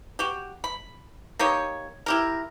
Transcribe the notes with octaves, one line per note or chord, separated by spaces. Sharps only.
F#4 G4
B5
A#3 D#4 G4 C#5
E4 G4 A#4